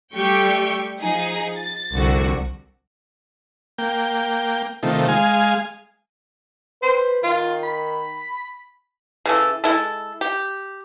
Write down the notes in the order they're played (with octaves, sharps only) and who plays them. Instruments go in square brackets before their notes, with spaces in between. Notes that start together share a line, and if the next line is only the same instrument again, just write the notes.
[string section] G3 A3 G4 G5 C#6
F3 D#4 G#4
A6
C2 F2 D3 F#4
[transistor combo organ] A#3 G5
C3 D#3 F3 A3
G#3 F5 G#5
[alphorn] B4 [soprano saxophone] C5
[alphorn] D#3 [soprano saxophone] F4
[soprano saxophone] B5
[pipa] C#3 E3 A4
G#3 E4 A4
G4